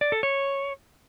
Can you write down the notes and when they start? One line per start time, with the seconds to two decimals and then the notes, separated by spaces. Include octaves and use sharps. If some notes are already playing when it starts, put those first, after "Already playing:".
0.01 D5
0.12 A4
0.23 C#5